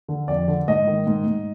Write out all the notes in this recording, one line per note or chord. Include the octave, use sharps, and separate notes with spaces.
D3
F2 D5
D3
G#2 D#5
D#3
G#2
G#2